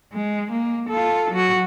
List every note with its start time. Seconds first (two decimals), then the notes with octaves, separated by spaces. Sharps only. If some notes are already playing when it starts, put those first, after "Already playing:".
0.13 G#3
0.51 A#3
0.89 F4 A4
1.31 F#3 F#4